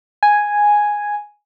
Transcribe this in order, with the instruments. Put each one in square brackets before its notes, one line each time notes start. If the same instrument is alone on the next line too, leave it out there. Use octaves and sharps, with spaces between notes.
[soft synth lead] G#5